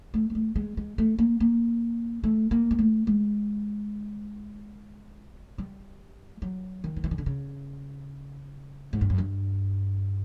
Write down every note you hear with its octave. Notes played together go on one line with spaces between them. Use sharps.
A3
G#3
A3
G#3
G#3
A3
A#3
A#3
A3
A#3
G#3
A3
G#3
G3
F#3
D#3
F3
E3
D#3
D3
C#3
G#2
G2
F#2
G2